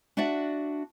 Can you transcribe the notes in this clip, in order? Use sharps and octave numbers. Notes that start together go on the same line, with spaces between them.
D4 F#4 D5 E5 F#5